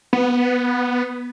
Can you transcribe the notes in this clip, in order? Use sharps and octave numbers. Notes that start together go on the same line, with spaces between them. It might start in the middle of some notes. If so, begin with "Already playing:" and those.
B3